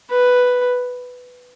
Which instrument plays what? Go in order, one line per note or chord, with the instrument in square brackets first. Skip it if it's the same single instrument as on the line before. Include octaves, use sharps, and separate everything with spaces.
[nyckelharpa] B4